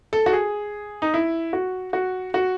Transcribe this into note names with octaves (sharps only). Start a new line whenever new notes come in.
A4
F#4
G#4
D#4
E4
F#4
F#4
F#4